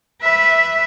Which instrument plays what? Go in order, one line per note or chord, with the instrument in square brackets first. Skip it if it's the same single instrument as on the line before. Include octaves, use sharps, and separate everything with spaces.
[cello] B4 E5